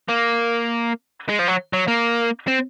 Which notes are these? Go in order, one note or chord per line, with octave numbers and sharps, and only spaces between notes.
A#3
G#3
F3
F#3
F#3
A#3
C4